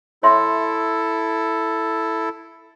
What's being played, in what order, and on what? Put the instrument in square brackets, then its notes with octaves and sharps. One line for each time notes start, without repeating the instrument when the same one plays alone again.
[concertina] E4 A4 [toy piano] C#5 E5 C6